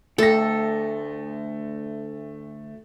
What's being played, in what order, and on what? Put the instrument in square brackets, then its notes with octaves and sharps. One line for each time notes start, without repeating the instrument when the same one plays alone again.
[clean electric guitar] D2 G5 [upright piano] A3 A#6 [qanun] A4